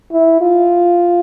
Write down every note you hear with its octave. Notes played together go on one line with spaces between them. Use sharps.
E4
F4